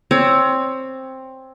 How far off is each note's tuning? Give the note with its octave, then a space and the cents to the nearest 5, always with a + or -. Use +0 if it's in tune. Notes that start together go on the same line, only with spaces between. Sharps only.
C4 +10 C#5 +25